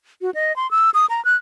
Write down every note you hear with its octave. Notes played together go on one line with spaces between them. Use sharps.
F#4
D#5
C6
E6
D#6
A#5
F#6